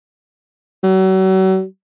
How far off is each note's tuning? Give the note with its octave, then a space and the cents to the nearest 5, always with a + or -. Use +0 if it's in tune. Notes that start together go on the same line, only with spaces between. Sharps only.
F#3 +40